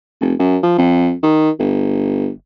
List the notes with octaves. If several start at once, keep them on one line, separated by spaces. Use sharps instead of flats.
F1
F#2
F3
F2
D#3
G1